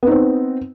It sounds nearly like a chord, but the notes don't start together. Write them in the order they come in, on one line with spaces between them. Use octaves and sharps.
B3 D#4 C4